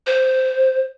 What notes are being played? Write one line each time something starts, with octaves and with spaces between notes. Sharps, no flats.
C5